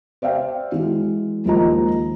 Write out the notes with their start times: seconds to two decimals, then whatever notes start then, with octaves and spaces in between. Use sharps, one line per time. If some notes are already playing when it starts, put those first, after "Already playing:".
0.22 C5 D5 E5 F5 G5
0.72 E3 G#3 F#4
1.45 D#2 F3 G#3 F4 D#5 A#5